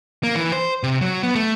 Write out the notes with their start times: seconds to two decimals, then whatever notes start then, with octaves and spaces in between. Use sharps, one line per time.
0.23 A#3
0.35 E3
0.52 C5
0.83 C3
1.01 F#3
1.23 B3
1.35 A3